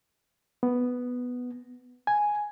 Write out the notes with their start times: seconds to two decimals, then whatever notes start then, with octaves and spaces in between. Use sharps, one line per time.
0.63 B3
2.07 G#5